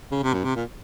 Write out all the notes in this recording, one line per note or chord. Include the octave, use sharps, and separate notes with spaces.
C#3
C3
F#2
C3
A#2